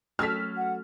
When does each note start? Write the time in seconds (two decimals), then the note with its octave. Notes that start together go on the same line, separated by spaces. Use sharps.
0.19 F#3 A3 C#4 F#4 A4 F6 B6
0.57 F#5